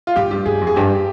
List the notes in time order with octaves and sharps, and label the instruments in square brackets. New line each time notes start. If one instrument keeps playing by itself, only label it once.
[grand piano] F4
[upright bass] G#2 [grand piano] G4
[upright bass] G2 [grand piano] G4
[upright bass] G2 [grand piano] G#4
[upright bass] F2
[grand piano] G#4
[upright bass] G2 [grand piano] G4